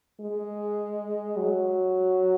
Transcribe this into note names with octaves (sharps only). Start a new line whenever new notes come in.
G#3
F#3